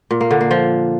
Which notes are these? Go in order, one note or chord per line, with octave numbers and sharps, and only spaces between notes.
A#2
A#3
D3
A#3
F3